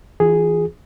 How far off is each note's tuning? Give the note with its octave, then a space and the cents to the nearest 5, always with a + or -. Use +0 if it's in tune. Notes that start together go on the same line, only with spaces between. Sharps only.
E3 +0 F4 +40 G#4 +0